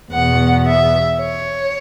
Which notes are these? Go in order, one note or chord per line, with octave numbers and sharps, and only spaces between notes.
E2 B2 B3 F#5
E5
C#5